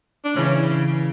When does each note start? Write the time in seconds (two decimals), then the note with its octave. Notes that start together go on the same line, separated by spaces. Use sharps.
0.24 D4
0.35 C#3 E3 C#4
0.67 C#3